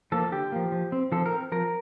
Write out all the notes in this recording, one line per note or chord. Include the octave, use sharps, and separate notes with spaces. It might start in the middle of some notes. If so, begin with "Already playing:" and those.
F3 A#3 A4
D3 G4
F3 A#3
F3
C4
F3 A4
A#4
C4
F3 A#4